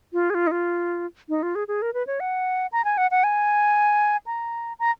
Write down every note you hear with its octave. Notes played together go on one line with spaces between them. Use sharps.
F4
G#4
F4
D#4
F4
D#4
F4
G#4
G#4
A#4
B4
C#5
F#5
A#5
G#5
F#5
F#5
G#5
A#5
A#5